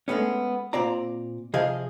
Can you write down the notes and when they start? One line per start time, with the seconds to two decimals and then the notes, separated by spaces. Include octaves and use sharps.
0.08 G#3 A3 B3 C#4
0.73 A#2 C4 D5 A#5
1.54 C3 F3 G#4 D#5 F5